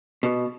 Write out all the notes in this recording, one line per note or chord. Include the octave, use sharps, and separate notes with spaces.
B2